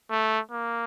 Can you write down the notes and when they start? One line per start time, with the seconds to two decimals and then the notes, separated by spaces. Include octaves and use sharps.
0.11 A3
0.51 A#3